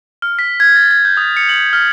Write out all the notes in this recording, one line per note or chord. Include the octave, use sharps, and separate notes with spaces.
F6
B6
G#6
A6
G#6
G6
D#6
C#7
F#7
F6